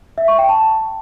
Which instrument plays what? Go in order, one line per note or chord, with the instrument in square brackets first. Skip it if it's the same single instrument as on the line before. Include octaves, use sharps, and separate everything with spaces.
[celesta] E5
C#6
G5
A5